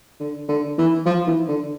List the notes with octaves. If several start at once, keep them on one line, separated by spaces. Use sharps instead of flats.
D3
D3
E3
F3
E3
D3